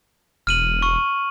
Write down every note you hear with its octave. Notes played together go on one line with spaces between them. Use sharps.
E1 F6 D#7 F#7
C#6